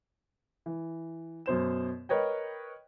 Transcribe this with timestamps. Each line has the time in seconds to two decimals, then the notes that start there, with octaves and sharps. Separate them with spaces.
0.66 E3
1.46 F#2 B2 C5 E7
2.09 A#4 B4 C#5 D#5 G5